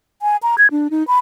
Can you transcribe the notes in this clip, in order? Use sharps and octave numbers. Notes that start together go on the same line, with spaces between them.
G#5
A#5
G#6
D4
D#4
B5